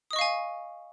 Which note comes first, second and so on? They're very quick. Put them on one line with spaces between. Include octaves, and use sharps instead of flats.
D#6 D#5 C#6 F5 G#5